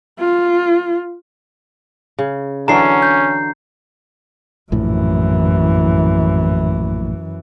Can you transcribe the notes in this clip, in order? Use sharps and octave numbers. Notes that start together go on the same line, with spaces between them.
F4
C#3
D3 E3 F#3 C#4 A#5 C7
G6
A#1 F#2 A2 E3